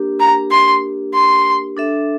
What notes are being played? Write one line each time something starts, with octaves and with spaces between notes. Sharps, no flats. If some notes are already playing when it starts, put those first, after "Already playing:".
Already playing: A#3 D4 G4 A#4
A#5
C6
C6
D4 A4 E5